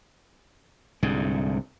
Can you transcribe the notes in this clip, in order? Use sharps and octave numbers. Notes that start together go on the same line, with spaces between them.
C2 G#2 D3